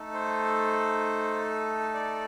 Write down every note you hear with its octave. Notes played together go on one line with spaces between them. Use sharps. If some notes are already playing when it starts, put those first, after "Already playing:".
Already playing: A3 D#4 A4
C5
D5